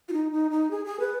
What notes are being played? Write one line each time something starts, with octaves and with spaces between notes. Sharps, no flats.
F4
D#4
D#4
D#4
G#4
G#4
B4